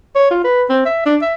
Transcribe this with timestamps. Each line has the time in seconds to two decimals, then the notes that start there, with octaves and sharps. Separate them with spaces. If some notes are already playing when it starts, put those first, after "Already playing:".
0.15 C#5
0.31 F4
0.44 B4
0.69 C4
0.85 E5
1.06 D4
1.22 E5